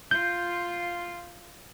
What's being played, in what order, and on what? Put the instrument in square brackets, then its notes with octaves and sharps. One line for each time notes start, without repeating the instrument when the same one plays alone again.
[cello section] F4 [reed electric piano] G6